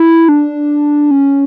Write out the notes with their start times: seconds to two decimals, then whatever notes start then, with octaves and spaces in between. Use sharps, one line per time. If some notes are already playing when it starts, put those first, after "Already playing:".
Already playing: E4
0.29 D4
1.11 C#4